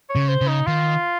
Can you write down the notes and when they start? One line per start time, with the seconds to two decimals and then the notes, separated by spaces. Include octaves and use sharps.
0.10 C#5
0.15 C#3
0.28 C5
0.41 C#3
0.48 D#4
0.67 D#3 F4